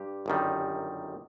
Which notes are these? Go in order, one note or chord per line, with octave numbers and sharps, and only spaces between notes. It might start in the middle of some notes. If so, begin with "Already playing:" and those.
Already playing: G2 G4
G1 F#2 D#3 G3